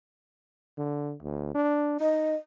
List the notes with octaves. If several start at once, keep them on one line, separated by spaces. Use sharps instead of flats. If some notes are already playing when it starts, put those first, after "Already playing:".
D3
D2
D4
D#4 D#5